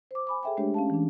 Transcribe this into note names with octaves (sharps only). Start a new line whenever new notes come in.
C5 D6
G#5 B5 D6
G#4 A4 E5 G5 G#5
G#3 A3 D4 G4 C#5
C#4 F5 A5
E3 D4